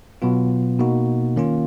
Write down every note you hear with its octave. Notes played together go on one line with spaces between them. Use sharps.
B2 F#3 B3 F4
B2 A#3 D#4 F#4
D#3 A#3 C#4 F4